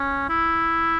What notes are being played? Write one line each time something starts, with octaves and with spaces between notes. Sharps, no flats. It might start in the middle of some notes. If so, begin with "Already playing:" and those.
Already playing: C#4
E4